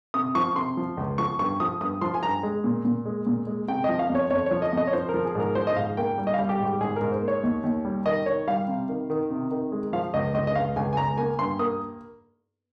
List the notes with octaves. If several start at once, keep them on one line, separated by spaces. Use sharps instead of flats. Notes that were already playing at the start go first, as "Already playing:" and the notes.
C3 D#6
F3 C#6
C3 C6
F3
C#2
F3 C#6
G2 C#6
F3 D#6
G2 D#6
F3 C6
G#5
G2 A#5
G#3
A#2
A#2
G#3
A#2
G#3
C3 G5
F3 D#5
F5
F2
C#5
F2 C#5
F3 C#5
D#5
F2 D#5
C#5
F3 C5
A#4
F3
G#4
G#2 A#4
F3 C5
D#5
G#2 F5
A#3 G5
G3
D#5
G3 F5
G4
G#2
G4
G#2 G#4
A#4
G#2
C5
A#3
C#5
D#2
D#2
G3
D#3 D#5
D#3 C#5
G3 F5
C3
D#3
D#3
C3
D#3
G#3
F3 F5
C#2 D#5
C#2 D#5
D#5
C#2 F5
C#2 G#5
G#5
C#2 A#5
A#3 G#5
G2 C6
A#3 D#6